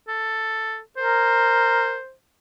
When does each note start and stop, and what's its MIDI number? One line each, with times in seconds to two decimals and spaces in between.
0.08 0.79 69
0.97 1.99 70
0.97 2.12 72